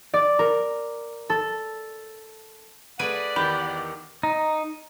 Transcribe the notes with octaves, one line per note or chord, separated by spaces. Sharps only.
D5
A#4
A4
A3 G#4 B4 D5 F#5 G#5 D7 D#7
E2 D#3 G4 B5
D#4